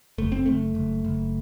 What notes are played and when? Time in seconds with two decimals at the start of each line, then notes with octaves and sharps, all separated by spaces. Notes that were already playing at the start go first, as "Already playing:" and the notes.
0.18 F#1 A3
0.32 C4
0.46 F#1 A3
0.75 F#1
1.05 F#1